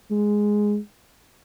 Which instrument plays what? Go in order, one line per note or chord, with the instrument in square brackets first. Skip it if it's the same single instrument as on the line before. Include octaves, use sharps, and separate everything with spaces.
[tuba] G#3